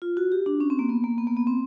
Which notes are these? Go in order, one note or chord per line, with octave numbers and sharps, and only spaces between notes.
F4
F#4
G4
D4
C#4
C4
A#3
B3
A#3
B3
A#3
B3
C4